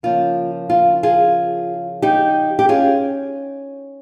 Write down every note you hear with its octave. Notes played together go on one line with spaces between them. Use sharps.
C#3 F3 A#3 F4
F4
F4 G#4
D#4 G4
G4
C#4 F4 G#4